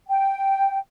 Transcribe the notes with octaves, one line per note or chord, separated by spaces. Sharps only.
G5